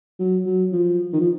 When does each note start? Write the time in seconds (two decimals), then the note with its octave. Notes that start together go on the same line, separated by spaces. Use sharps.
0.20 F#3
0.46 F#3
0.72 F3
1.13 D#3
1.20 F3